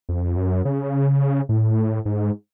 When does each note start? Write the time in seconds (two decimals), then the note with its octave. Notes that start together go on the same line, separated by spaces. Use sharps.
0.09 F2
0.37 F#2
0.65 C#3
1.49 A2
2.05 G#2